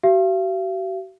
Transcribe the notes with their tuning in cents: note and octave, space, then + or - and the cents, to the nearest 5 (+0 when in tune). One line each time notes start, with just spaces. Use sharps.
F#4 +45 F5 -45